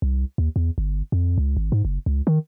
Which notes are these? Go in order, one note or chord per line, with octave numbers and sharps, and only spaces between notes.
C2
D#2
E2
G1
F2
C#2
G#1
G#2
F#1
C#2
D#3